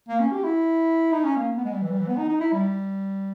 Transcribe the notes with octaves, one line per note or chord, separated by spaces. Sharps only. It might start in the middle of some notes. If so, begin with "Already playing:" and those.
A#3
C#4
G4
E4
D#4
C#4
A#3
B3
G#3
G3
E3
G3
E3
B3
D#4
D#4
E4
G3